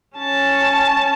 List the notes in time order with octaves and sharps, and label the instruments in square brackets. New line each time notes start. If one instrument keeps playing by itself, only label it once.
[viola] C#4 A5